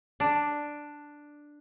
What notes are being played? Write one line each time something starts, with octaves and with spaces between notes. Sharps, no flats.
D4